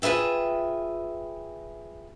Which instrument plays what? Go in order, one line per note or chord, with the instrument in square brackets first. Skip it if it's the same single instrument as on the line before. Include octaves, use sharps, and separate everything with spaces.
[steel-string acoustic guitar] F4 G#4 B4 E5 G5